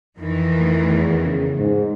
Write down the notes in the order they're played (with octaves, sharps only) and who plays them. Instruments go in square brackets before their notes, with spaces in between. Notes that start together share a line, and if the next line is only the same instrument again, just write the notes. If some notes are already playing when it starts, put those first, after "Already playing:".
[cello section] F2 D#3 E3
[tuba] A3
E2
C#3
G#2